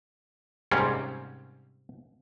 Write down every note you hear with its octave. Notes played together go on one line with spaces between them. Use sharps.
G#2 C3 G3 A#3 C4 C#4